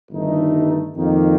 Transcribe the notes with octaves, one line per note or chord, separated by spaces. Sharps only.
G1 G2 D#3 A3 D#4
F2 D#3 A#3 D#4